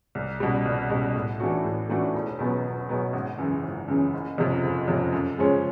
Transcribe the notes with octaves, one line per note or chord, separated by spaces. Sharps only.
C2
B2 G3
C2
B2 G3
A2
E3 A3 D4 F#4
A2
E3 A3 D4 F#4
E1
E2 B2 F#3 B3
E1
E2 B2 F#3 B3
G#1
F#2 C#3 E3
G#1
F#2 C#3 E3
F#1
F2 C3
F#1
F2 C3
F#2
C#3 F3 G#3 C#4